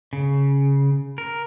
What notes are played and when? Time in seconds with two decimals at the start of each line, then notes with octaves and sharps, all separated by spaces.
0.13 C#3
1.18 A#4